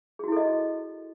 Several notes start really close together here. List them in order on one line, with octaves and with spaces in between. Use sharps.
G#4 F#4 E4 A4 D#5